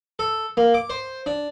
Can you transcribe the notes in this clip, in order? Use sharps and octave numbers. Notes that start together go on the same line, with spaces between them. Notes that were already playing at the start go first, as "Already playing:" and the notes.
A4
A#3
D6
C5
D4